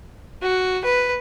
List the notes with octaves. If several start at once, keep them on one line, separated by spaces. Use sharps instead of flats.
F#4
B4